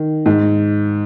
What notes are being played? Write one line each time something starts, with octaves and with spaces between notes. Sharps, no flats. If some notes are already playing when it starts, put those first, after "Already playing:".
Already playing: D#3
G#2